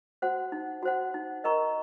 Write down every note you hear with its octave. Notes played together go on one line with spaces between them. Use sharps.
F#4 C5 F#5
D#4
F#4 C5 F#5
D#4
A#4 D#5 A#5 C#6